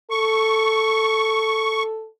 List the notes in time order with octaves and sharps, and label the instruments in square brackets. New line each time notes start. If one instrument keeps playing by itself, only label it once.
[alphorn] A4 [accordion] C#6